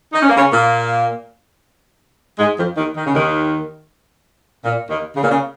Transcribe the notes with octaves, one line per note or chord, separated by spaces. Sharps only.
D#4
C#4
A#3
C#3 C#4
A#2 A#3
G#2 G#3
F2 F3
D#2 D#3
D#3
C#3
D#2 D#3
A#2
D#2 D#3
C#3
A#2
C#3